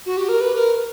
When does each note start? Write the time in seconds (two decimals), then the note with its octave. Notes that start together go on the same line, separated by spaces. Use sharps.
0.06 F#4
0.17 G4
0.29 A#4
0.41 B4
0.55 A#4